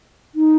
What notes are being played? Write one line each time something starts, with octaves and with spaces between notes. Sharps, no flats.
D#4